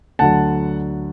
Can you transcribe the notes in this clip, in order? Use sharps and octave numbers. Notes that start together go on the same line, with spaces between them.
D2 D3 F#3 F#5 A5